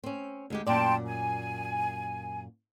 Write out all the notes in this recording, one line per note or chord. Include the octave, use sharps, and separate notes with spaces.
C4 C#4
D2 G#3 G4
F#2 A#2 D5 G5 A5 C6
G#5